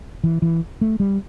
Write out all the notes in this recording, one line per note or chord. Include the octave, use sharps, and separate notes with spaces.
E3
E3
A3
G3